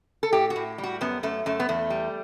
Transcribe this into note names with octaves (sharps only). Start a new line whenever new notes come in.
A4
A2 G4
F#4
A2
G3
F#4
F#2 B3
F#2 A3
F#2 A3
B3
E2 A3
G3